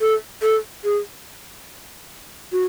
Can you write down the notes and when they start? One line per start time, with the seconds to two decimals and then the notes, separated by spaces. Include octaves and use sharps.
0.01 A4
0.42 A4
0.84 G#4
2.52 F#4